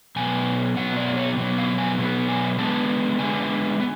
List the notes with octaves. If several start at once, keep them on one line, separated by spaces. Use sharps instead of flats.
B2 F#3 B3 G#5
B2 F#3 B3 F#5
D5
C#5
B2 F#3 B3
F5
G#5
B2 F#3 B3
G#5
D3 G#3 B3 A5
D3 G#3 B3 G#5
B3